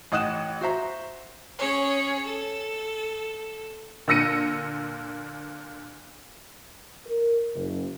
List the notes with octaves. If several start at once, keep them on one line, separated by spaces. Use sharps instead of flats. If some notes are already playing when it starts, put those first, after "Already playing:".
A1 D#4 F#5 D#6 F#6 E7
F#4 C5 E5 A#5
C#4 G#4 C#5
A4
A#2 D3 E6 A#6 C#7 D#7
A#4
F#1